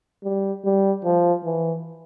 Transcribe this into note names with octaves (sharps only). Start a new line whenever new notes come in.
G3
G3
F3
E3